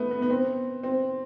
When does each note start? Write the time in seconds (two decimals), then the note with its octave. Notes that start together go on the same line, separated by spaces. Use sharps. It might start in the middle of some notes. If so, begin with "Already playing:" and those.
Already playing: A3 B3
0.11 B3
0.22 B3
0.30 C4
0.83 C4